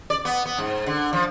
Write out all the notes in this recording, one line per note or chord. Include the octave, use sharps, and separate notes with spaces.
D5
B3
B3
G#2
D3
F3